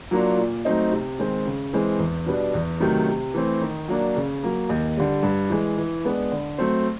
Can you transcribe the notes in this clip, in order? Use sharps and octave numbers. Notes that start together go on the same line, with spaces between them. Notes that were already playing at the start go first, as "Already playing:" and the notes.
F#3 A#3 D4 F4
A#2
F#3 A3 C4 D#4
C3
D#3 G#3 C4
C#3
E3 G#3 C4
E2
B2 G3 B3 D4
E2
C3 D#3 F#3 A3
C3
E3 A3 C4
D#3
F#3 A#3 D4
C#3
F#3 A#3
D#2
D3 G3
G2
E3 G#3
E3
G#3 B3 D4
D3
F#3 A3 C4